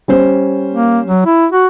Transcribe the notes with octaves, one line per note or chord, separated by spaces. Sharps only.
G3 C#4 C5
A#3
F#3
E4
F#4